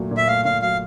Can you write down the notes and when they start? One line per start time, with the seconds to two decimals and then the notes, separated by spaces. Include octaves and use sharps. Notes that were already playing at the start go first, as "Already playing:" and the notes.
Already playing: A#2 F#3 A3
0.11 A#2
0.17 E5
0.27 A3 F5
0.45 A#2 F5
0.62 F#3 F5